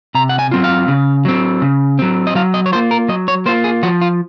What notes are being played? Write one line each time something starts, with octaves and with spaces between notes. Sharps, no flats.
C3 A#5
F#5
G#5
F#3 C4 F4
F5
C#3
F#3 C4
C#3
F#3 C4
D#5
F#3 F5
D#5
C#5
A#3 F4 C5
A#4
F#3 D#5
C#5
A#3 F4 C5
G#4
F3 F#4
F4